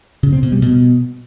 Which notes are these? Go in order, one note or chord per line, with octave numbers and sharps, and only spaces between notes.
C#3
C4
B2
G3
B2